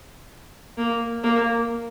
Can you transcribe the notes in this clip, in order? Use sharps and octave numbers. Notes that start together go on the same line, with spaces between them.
A#3
A#3